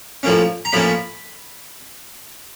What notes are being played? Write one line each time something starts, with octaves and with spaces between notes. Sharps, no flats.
A2 F3 A#3 C#4
A#5
A2 F3 A#3 C#4 B5